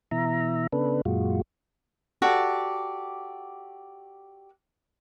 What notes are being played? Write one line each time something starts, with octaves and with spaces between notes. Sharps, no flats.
B2 E3 E5 A#5
C#3 B3 D4 A4 B4
F#2 A#2 G#3 F4 F#4
F#4 G4 A4 D5